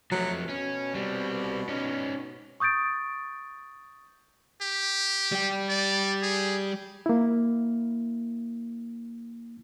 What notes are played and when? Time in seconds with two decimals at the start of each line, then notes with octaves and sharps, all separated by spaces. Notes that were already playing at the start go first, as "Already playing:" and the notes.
0.11 F3 F#3 A3
0.49 B2 C#4
0.95 G3 C4
1.69 C#4 D#4
2.60 C#6 D#6 G6 A6 D7
4.62 G4
5.32 G3 G5
5.69 D5
6.22 G#4
7.06 A#3 E4